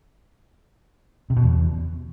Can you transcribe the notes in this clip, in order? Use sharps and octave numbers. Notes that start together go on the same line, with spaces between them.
C3
B2
E2